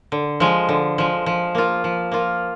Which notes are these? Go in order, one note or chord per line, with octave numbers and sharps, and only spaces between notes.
D3
F3 G#3
D3
F3 G#3
F3
A#3 F4
F3
A#3 F4